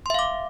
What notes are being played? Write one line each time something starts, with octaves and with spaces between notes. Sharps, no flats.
E5 F5 C6 D6